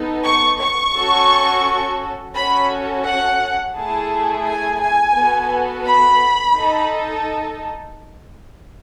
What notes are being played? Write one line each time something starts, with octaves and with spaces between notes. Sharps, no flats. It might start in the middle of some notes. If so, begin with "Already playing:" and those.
Already playing: B3 D#4 A4
C#6
C#6
C#4 F#4 A4
C#4 F#4 A4 B5
F#5
A3 E4 G#4 A5
G#5
G#5
B3 F#4 A4
B5
D#4 A4